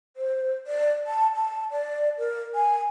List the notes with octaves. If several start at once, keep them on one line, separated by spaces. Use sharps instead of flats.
C5
D5
A5
A5
D5
A#4
G#5